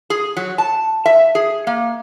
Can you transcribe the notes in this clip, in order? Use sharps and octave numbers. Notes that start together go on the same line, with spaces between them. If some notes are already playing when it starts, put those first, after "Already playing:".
G#4
F#3
A5
E5
G#4
A#3